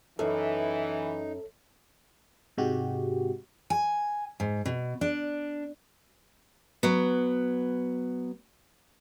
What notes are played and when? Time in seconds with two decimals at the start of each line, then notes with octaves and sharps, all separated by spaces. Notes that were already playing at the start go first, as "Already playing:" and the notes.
0.19 F#2 E3 D#4 A4
2.57 G#2 C3 G#3 F#4 G4
3.70 G#5
4.40 G#2
4.66 B2
5.01 D4
6.83 F#3 B3